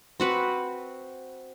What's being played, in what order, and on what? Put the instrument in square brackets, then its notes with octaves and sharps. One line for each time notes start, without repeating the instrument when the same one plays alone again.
[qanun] C4 F#4 B4